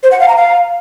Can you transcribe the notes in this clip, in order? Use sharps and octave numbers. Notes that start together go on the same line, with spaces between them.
C5
F#5
F5
A#5
F5